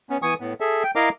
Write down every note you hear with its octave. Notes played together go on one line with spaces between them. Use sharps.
B3 C#4
E3 B3 G#5 C#6 D#6
A2 B3
G#4 A4 E5
G5
E4 A#4 D#5 F5 A#5 D6